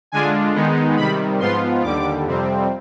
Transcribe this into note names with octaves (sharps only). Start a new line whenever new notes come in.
D3 G#3 D4 F4 G#5
D#3 G#3 B3 D#4
C3 D#3 G3 B5
G#2 F3 B3 F4 C6
D#2 D3 G3 D6
F2 C3 G3 C4